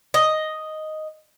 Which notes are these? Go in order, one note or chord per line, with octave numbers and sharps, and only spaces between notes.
D#5